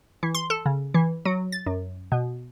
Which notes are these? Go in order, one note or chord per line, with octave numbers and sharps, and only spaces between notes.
E3
C6
A4
C#3
E3
F#3
A6
F#2
B2